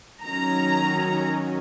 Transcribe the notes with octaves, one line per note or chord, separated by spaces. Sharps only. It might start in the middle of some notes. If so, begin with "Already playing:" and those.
D#3 F#3 C#4 A#5